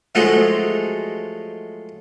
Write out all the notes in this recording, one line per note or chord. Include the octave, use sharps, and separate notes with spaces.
F3 F#3 G#3 A3 D#4 C5